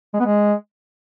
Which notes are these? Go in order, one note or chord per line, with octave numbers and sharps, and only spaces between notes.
G#3
B3
G#3